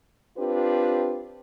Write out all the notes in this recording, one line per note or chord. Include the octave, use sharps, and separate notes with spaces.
C4 D4 F4 G4 B4